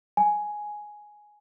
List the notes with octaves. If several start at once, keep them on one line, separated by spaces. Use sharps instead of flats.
G#5